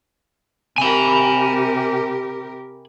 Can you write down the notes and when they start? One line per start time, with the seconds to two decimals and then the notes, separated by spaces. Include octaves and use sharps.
0.78 C3 G4 A#4 G#5 B5